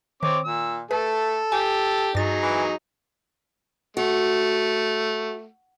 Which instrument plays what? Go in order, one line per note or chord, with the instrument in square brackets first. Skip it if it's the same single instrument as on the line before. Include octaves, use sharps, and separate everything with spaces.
[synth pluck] D#3 [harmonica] C4 C#5 D6
[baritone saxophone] A#2 [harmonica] E6
[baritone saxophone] A3 [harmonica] A4 [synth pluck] B4
[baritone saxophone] G4 [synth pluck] G#5
[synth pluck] G2 A6 [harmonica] F#3 D#4 G#4
[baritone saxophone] E3
[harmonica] A3 [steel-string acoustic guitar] F#4